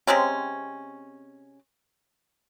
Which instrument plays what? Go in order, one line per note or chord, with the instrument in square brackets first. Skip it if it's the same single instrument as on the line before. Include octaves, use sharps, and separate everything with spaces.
[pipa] C3 G#3 C4 C#4